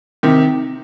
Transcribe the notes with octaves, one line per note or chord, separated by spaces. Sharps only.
C3 D#3